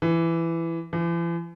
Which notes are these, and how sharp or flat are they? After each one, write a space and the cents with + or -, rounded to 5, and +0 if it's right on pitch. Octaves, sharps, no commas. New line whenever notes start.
E3 +15
E3 +45